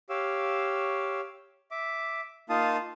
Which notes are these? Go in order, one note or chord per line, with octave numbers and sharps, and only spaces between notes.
G4 C#5 F5 E6
E5 D6
A#3 D#4 F4 F5 A5 D#6